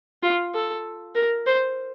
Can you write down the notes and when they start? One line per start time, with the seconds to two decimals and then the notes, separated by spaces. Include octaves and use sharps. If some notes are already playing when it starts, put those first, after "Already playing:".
0.23 F4
0.54 A4
1.15 A#4
1.47 C5